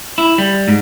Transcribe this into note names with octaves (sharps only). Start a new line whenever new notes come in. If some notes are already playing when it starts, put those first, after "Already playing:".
E4
G3
G#2